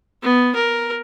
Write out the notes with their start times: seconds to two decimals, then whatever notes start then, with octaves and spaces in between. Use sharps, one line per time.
0.23 B3
0.56 A#4